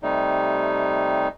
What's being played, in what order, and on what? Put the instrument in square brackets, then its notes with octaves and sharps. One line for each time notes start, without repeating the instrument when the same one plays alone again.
[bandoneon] C3 G3 A3 D#4